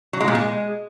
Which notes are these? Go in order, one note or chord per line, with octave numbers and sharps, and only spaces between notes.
F#3
G#3
A#2
G#3